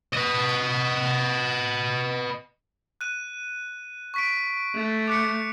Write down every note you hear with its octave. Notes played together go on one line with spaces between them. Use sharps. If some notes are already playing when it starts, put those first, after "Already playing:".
B4 D#5
F#6 D#7
C#6 B6 D7
A3
D6 F#6 C#7